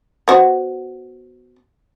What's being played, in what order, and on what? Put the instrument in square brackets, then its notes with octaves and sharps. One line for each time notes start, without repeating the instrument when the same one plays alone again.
[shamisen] B3 F#4 C5